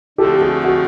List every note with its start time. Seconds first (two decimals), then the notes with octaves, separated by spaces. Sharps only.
0.18 D3 F3 A3 C4 G4 A4
0.42 F#4 G#4
0.64 F#4 G#4